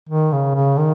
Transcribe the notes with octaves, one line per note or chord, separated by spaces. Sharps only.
D#3
C#3
C#3
D#3